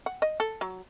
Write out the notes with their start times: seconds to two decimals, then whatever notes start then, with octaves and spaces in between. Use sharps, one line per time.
0.06 F#5
0.22 D#5
0.40 A4
0.61 F#3